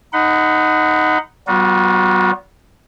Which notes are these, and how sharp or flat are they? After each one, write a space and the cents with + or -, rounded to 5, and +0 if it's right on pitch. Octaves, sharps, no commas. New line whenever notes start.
D#4 +0 F#5 +0 B5 +40
G3 -45 B3 +0 F#4 -45